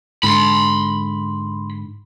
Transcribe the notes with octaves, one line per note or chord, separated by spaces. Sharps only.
G#2 D3 B5 C6